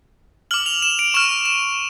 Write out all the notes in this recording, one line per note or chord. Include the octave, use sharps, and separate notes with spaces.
D6 F6 F#7
F7
E7
D7
C#6 F6 E7
E7